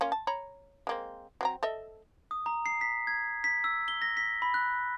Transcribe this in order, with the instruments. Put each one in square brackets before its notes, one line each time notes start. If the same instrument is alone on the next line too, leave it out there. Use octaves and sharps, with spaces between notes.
[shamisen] A#3 C#4 F4
A5
C#5 A#5 B5
G#3 A#3 C4
F#3 C4 A#5
A4 D#5 E5
[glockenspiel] D#6
A#5
C7
B6
G#6
B6
E6
G7
A#6
B6
B5
F#6